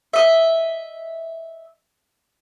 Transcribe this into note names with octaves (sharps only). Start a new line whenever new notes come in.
D#5 E5